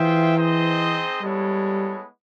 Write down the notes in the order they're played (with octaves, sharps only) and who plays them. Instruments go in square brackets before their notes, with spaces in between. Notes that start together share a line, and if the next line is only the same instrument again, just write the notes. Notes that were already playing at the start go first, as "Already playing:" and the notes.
Already playing: [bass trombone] E3 [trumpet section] F4 G#4 C5 E5 G5
[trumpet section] C4 D#4 G#4 C5 D#5
[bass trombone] G3 [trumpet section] G#3 B3 E4 A4 C#5